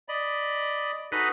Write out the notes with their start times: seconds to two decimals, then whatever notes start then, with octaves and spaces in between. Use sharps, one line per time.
0.09 D5 D#5 B5
1.12 D#4 F#4 G#4 A4 B4